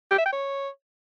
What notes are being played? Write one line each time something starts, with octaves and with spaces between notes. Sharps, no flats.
G4
E5
G5
C#5